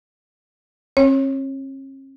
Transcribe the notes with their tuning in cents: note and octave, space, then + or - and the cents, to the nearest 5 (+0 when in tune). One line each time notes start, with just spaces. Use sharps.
C#4 -45 C#5 -20